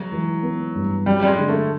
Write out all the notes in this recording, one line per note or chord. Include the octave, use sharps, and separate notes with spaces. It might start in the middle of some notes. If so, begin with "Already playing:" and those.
Already playing: F#3 G#3
E3
B3
G2
F#3 G3
G3
G#3
D3
A3